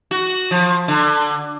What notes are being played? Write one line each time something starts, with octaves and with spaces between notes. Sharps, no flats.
F#4
F3
D3